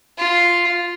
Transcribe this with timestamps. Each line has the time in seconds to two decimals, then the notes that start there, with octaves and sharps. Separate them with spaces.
0.18 F4